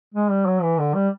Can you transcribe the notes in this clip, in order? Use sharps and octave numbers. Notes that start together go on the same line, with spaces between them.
G#3
G3
F#3
E3
D3
G3